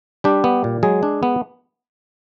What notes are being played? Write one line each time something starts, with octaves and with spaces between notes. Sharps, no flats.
G3 D4 G4
B3
A#2
F#3 G#3 G#4
D4
B3